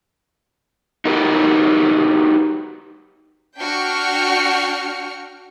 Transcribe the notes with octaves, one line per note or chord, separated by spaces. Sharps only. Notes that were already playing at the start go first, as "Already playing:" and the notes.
D#4 F#4 G4 A#4 B4
D4 F#4 G5 F6 C#7